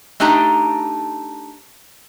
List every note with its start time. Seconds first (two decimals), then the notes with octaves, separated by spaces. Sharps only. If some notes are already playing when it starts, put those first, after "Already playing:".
0.20 A3 D4 D#4 G4 A#5